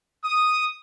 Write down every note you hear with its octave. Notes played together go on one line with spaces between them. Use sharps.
D#6